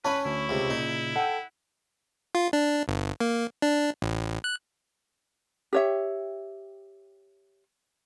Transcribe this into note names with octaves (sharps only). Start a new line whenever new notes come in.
C#4 B4 G#5 A5 B5 C#6
D2 E4
C#2 C3
A#2 C#3 D#4
A4 F#5 G5
F4
D4
G1
A#3
D4
A1
F#6
G4 C#5 E5